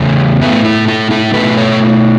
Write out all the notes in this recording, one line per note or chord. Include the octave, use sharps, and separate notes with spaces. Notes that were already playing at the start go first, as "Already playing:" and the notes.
Already playing: E2 C#3 A3 C#4
A2 A3 B3 E4
E4 A4
E4 A4
E4 A4
B2 A3 F#4 B4
A4 C#5